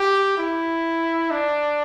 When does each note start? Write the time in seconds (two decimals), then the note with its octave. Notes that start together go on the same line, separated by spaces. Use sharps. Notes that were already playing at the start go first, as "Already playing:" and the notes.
Already playing: G4
0.37 E4
1.31 D4